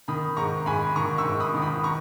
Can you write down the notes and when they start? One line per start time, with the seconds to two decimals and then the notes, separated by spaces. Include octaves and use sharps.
0.08 D#3 B5 D#6
0.37 G#2 A#5 C#6
0.66 G#2 G#5 B5
0.96 D#3 A#5 C#6
1.18 C#6 E6
1.25 G#2
1.40 B5 D#6
1.54 D#3
1.62 B5 D#6
1.84 A#5 C#6